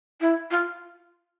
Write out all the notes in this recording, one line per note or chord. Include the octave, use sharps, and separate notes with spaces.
E4
F4